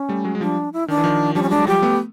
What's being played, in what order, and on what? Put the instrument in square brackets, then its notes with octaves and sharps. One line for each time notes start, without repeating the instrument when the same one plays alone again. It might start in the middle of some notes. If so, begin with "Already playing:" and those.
Already playing: [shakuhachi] C#4
[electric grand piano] G3 A3
F#3 G#3
G#3
[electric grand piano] F3 G3 [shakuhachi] D4
[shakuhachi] E4
[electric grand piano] D#3 [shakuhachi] D4
[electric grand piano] E3
D#3 F3
[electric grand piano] F3 G3 [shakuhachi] D4
[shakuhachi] C#4
[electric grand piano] F#3 G#3 [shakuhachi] D4
[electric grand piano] F#3
[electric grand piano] F3 G3 [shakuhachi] G4
[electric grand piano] A3 B3